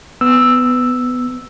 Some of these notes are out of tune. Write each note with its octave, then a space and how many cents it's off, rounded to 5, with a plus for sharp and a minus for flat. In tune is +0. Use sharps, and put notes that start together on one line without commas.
B3 +15 E6 +0